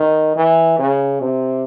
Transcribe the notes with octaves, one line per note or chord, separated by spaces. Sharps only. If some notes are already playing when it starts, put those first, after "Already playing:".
Already playing: D#3
E3
C#3
C3